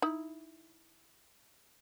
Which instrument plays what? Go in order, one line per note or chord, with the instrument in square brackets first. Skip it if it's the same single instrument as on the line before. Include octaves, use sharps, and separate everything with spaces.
[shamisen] D#4 E4